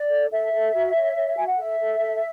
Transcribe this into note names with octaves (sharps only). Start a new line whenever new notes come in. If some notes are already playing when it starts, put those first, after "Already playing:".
Already playing: D5
A4
A4 E5
A4
F#4
C#5
C#5
F#4 G#5
F#5
A4 E5
A4
A4